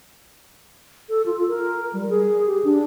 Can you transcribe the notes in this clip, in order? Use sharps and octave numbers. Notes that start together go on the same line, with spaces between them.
A4
F4
A#4
G3
G#4
G4
D4